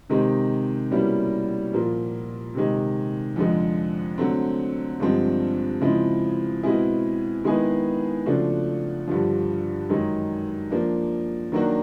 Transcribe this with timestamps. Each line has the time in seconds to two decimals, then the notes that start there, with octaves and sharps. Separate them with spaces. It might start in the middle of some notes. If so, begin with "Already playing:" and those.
0.09 C3 D#3 G#3 C4
0.91 B2 G3 A#3 C#4 E4
1.73 A#2 F3 A#3
2.55 C3 D#3 G#3
3.36 F2 D3 F3 G#3
4.18 D3 F#3 A3 C4
5.00 G2 D3 F3 G#3 C4
5.81 C#3 F3 G#3 C4 E4
6.63 B2 G#3 C4 E4 G#4
7.44 D#3 G#3 B3 E4 G#4
8.26 C#3 F3 A3 D4 F#4
9.08 G2 D3 F3
9.89 F#2 D#3 G#3
10.70 F3 A#3 D4
11.52 D#3 F#3 A#3 D4 F#4